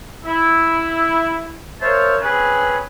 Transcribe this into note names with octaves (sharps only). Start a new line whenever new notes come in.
E4
A#4 C5 C#5 E5 F5 A5
C4 C#4 G#4 B4